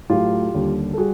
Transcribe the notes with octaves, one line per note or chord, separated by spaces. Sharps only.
A2 F#3 A3 F4 G4
D#2 D3 G3
A4
G3 F#4 G#4